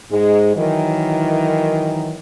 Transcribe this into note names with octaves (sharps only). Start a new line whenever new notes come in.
G#2 G#3
D#3 E3 F#3